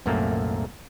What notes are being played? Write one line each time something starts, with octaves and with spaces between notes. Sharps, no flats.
C2 F#2 A#2 A3 A#3